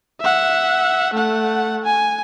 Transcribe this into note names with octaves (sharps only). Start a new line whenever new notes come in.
E5 F#5
A3 F#5
G#5